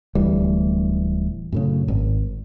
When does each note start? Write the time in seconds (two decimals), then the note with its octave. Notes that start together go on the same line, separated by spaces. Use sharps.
0.15 D1 D2 E3 G3
1.52 F#2 A2 C#3
1.88 G#1